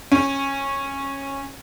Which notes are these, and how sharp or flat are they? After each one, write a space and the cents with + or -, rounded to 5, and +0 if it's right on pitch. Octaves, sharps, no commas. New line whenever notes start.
C#4 -15